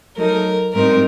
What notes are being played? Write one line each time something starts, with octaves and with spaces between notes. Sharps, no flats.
F#3 A3 D#4 A#4
A2 G3 C4 D#4 A#4